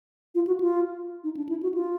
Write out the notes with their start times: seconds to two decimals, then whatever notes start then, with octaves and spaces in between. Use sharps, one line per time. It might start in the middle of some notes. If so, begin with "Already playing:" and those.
0.35 F4
0.47 F#4
0.60 F4
1.24 D#4
1.37 D4
1.49 E4
1.63 F#4
1.74 F4